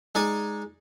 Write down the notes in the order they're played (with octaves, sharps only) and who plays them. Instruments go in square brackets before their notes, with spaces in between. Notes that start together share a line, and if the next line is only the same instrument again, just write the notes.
[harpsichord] G#3 D#4 D5 G#5